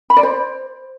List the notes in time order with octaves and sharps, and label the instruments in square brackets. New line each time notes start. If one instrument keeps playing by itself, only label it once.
[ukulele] B5
D5
C5